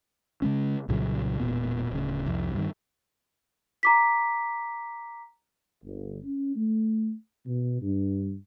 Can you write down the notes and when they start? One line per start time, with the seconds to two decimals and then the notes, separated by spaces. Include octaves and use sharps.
0.42 C#3 G#3 C#4
0.88 C2 A#2 C#3 F#3
1.40 E1 E2 A#2 B3
1.90 D1 C#3
2.26 C2 F2
2.54 G2 D#3
3.83 A#5 D6 B6
5.84 G1
6.23 C#4
6.55 A3
7.46 B2
7.81 G2